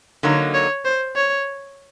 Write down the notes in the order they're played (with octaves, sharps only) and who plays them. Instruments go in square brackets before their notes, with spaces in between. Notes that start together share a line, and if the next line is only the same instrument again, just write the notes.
[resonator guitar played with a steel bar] D3 F#3 A#3 D#4 [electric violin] C#5
[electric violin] C#5
C5
C#5